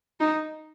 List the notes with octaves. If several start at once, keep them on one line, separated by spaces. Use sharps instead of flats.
D#4